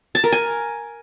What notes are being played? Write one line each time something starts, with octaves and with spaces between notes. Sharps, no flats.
A5
A#4
G#5